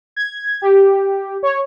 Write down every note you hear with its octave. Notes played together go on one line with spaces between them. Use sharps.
G#6
G4
C#5